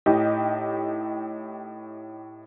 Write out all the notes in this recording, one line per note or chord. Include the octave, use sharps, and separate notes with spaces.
A2 D#4 G4